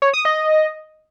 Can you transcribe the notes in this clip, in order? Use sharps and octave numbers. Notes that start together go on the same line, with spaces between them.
C#5
D#6
D#5